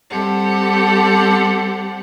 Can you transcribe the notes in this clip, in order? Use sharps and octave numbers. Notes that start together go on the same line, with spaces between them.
G3 C4 G4 A4 F#5